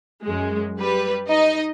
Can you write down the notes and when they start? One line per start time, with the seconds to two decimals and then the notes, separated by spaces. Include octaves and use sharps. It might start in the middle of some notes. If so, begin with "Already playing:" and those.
0.23 F#2 G#3
0.79 G3 B4
1.28 D#4 D#5